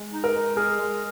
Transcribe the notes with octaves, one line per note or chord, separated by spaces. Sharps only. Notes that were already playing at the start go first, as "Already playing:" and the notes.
Already playing: G#3
D#4
A#4
G#3
G#4 A#4
G#3